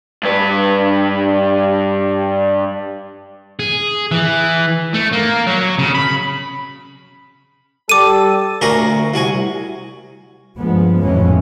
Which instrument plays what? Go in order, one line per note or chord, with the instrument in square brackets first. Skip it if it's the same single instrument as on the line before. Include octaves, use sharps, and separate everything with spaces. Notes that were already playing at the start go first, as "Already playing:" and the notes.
[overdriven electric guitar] G2 B4
[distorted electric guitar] G#4
E3
A3
A#3
F#3
C#3
B5
[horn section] G3 A4 [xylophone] D6 D#7
[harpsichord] D2 A#2 C#4 F#4 A#4 D#6
C2 F#4 G#5
[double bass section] G2 F3 G#3 B3
G#1 F2 A2 E3 G#3 C#4